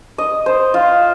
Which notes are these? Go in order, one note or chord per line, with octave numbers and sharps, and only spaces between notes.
D#5
C5
F4